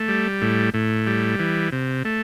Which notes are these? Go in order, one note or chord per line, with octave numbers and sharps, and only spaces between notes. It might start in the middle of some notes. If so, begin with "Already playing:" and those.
Already playing: A3
G3
A2
A2
G3
E3
C3
A3